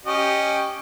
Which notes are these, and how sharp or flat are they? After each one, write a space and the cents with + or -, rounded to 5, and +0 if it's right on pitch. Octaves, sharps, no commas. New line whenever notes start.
C#4 +0 G4 +0 D#5 -15